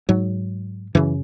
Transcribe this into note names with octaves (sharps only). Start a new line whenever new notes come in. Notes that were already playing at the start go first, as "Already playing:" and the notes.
G#2 F#3
F#2 C#3 E3